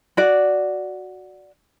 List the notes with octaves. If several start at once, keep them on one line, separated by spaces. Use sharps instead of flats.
F#4 D5